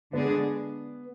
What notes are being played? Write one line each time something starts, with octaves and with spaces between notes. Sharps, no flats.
D3 G#3 B3 D4 G#4